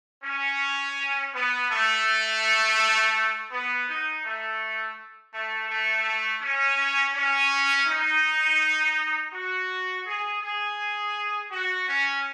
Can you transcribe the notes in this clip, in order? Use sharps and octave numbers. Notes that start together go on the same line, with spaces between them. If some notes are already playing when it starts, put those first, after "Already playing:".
C#4
B3
A3
B3
D#4
A3
A3
A3
C#4
C#4
D#4
F#4
G#4
G#4
F#4
C#4